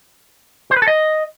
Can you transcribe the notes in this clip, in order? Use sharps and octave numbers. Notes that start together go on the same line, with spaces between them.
C5
B4
A4
D#5